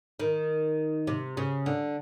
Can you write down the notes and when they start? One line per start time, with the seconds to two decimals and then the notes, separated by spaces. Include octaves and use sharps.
0.20 D#3
1.07 C3
1.37 C#3
1.66 D3